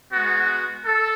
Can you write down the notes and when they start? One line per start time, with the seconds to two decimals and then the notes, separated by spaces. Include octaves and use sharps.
0.10 G#3 B3 F#4
0.86 A4